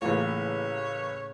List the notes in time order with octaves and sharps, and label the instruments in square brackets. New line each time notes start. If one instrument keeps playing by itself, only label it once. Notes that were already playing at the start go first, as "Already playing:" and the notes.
[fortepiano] A1 A#3 F4 [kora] A2 C#3 [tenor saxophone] C#5